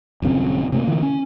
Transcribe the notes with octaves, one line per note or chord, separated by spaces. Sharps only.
D#1 F#2 C#3 C4
C3 A3 A#3
D3 E3
C#4